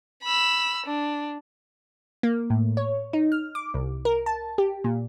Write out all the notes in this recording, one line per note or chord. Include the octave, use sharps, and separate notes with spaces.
B5 E6
D4
A#3
A2
C#5
D#4
F6
D6
C2
A#4
A5
G4
A#2